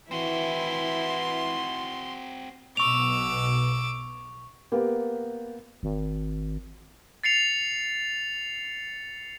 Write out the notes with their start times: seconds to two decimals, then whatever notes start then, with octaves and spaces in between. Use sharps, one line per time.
0.11 E3 C4 E4 F#4 C6
2.77 B1 B2 C#6 D6 E6 F7
4.72 A#3 B3 G4
5.83 G#1
7.24 A6 C7 C#7 F7